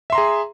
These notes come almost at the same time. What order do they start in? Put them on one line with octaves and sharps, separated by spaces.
E5 C6 A#5 G#4